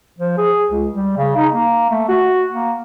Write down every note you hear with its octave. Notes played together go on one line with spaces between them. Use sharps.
F3
G#4
C#2
G3
C#3
D#4
A#3
A3
F#4
A#3